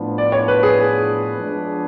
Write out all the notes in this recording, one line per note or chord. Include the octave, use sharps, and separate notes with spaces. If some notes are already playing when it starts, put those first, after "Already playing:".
Already playing: A2 F3 B3 D4
D5
C#5
B4
G#4
F3 G#3 B3 D4